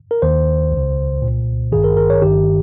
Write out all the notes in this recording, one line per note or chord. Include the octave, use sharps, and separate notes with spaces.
A#4
D#2 D#3 C5
C#2 C#3
C2 A#2
G#1 G2 D#3 G#4
A#4
A#4
C#5
G1 G2 D#3 G4